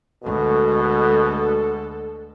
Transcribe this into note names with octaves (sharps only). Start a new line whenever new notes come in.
D2 B2 G#3 A4